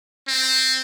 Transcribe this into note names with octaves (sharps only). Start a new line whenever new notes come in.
C4